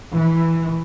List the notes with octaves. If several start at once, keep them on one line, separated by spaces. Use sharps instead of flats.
E3